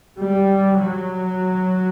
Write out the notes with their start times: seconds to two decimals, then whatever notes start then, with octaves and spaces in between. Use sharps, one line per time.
0.19 G3
0.80 F#3